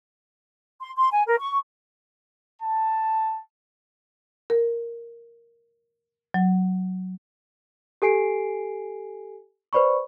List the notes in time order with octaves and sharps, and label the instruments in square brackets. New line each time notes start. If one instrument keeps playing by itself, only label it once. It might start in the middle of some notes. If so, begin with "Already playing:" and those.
[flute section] C6
C6
G#5
A#4
C#6
[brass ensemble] A5
[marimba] A#4
F#3
[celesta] G4 A4 G#5 C7 D7
B4 C5 D5 B5 C#6